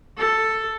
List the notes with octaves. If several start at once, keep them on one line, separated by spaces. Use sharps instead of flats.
A4